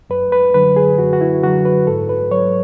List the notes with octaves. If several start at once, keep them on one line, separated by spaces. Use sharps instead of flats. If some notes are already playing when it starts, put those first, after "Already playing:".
F#2 B4
B4
D3 F#3 B4
G#4
F#2 F#4
F#4
E4
D3 F#3 F#4
B4
G#2 A4
B4
F#3 C#5